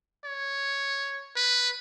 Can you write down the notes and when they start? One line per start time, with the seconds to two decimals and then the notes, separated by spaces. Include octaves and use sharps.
0.25 C#5
1.36 B4